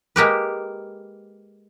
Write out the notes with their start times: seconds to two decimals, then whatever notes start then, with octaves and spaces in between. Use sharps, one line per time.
0.16 G#3 A#3 G4 B4